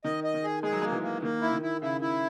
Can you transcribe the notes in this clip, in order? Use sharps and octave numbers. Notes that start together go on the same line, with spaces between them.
D#3 D#5
D#5
D#3
G#4
G#3 G#4
F#3
G#3 A#3
E3
A#3
D#3 A#3
E4
D#3
E4
C#3 E4
E4